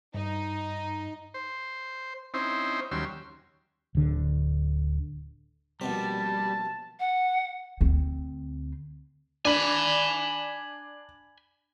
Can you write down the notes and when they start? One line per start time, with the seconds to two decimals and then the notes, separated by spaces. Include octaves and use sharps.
0.14 G2 D#4
1.34 C5
2.34 C4 C#4 D#4 E4 C5
2.91 D#2 F#3 G3 C#4 C6 E6
3.95 D1 D3
5.81 A#1 B2 G3 C4 A5
7.00 F#5
7.81 D2 C4
9.45 D4 G#5 B5